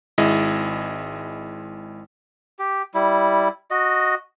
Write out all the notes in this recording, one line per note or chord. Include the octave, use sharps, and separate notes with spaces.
G#1 G#3 E4 D#5
G4
G3 E4
F#4 D#5